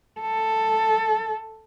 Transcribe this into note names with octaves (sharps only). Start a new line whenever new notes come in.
A4